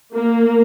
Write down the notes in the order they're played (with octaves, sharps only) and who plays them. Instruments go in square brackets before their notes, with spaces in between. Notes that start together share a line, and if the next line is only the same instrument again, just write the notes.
[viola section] A#3